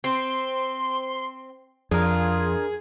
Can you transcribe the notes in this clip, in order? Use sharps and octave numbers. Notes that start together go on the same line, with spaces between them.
C4 C6
F2 D4 F4 G#4 A#4